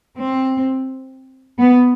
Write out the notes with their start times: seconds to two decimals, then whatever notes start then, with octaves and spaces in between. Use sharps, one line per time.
0.17 C4
1.60 B3